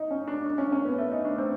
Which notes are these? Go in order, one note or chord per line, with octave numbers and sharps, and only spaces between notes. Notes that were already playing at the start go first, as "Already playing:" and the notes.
Already playing: D#4
C#4
D4
D4
C#4
C#4
B3
A3
D#4
D4
C4